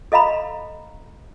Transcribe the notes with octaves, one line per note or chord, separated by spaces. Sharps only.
A4 D#5 F5 A#5 B5